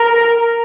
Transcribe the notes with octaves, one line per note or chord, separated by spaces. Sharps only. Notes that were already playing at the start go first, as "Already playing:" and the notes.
Already playing: A#4